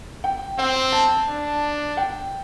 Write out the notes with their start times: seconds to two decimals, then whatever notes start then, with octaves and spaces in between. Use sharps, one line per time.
0.24 G5
0.58 C4 G5
0.92 A5
1.28 D4
1.97 G5